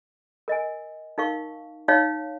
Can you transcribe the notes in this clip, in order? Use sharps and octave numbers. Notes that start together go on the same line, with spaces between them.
A#4 D#5 G#5
D#4 A#4 F5 C#6
D#4 C#5 F5